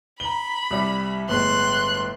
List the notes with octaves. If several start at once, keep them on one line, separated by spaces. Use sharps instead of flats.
A#5 B5 G7
C2 G3
G1 A2 G#3 C6 F#6